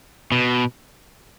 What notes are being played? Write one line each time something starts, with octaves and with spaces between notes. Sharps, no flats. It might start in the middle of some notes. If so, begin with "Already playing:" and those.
B2